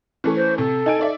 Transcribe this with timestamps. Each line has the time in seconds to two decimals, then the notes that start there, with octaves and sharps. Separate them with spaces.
0.24 E3 A3 C#4
0.36 C5
0.58 C3 A4
0.86 D#4 G#5 D7
0.99 D#4 D5 E5